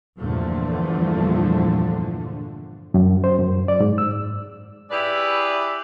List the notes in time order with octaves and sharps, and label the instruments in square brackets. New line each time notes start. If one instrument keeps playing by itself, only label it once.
[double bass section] E2 G2 A#2 D3 F3 A3
[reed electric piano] F#2
C5
F#2
D5
G#2
E6
[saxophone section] E4 G4 G#4 B4 D5 E5